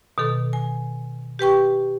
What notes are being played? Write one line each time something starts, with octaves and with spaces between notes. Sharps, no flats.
B2 D#3 A4
G#5
G4 B4 G5 C#6